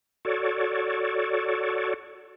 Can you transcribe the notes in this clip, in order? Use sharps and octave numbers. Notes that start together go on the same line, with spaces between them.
F#4 A4 C#5 D5